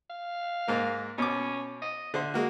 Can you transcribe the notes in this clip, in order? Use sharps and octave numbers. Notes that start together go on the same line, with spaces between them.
F5
G#2 A#3 A#4
B2 C#4 D6
D#5
D3 C5 E5
G#3 A#3 F#4